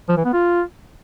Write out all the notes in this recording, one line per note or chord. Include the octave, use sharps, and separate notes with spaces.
F3
E3
B3
F4